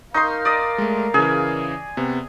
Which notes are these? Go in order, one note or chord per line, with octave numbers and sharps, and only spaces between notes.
D#4 A#4 F5 C6 C#6 D#6 G6
D5 D#5 D#6
G#3 A3
C#3 E3 G#4
C3 B3